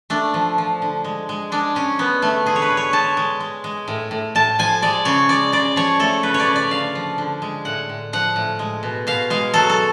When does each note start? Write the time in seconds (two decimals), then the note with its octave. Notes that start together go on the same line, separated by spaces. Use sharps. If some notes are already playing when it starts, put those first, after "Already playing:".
0.10 A3 D4
0.34 F3
0.58 F3
0.82 D3
1.04 G#3
1.29 G#3
1.52 G#3 D4
1.75 G#3 C#4
1.99 G#3 B3
2.22 D3 A3
2.46 D3 G#4
2.56 C#5
2.62 B4
2.70 D3
2.77 C#5
2.93 G#3 A5
3.17 G#3
3.40 G#3
3.64 G#3
3.88 A2
4.11 A2
4.35 A2 A5
4.59 F3 G#5
4.82 G#3 D5
5.05 C#3 C#5
5.29 G#3 D5
5.52 C#3 D5
5.76 F3 C#5
6.00 A3 A4
6.23 C#3 B4
6.34 C#5
6.40 D5
6.47 C#3
6.56 D5
6.70 D3 F5
6.95 F3
7.18 D3
7.42 G#3
7.65 A2 F#5
7.89 A2
8.13 F3 F#5
8.36 A2
8.59 G#3
8.83 B2
9.07 B2 F5
9.30 G#3 F5
9.54 F#3 A4
9.70 A4